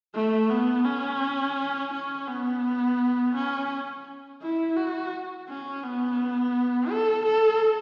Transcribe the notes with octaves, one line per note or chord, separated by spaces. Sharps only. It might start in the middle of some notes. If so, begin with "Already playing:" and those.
A3
B3
C#4
C#4
B3
C#4
E4
F#4
C#4
B3
A4
A4